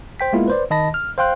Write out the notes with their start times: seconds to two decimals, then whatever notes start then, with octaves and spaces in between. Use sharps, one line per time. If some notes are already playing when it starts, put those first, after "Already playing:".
0.20 C5 G5 B6
0.33 G#3 A#3 B3 E4 F4
0.48 B4 C5 D5
0.71 D#3 D#5 A5 B5 A#6
0.94 F6
1.18 C5 F5 G5 C6 F#6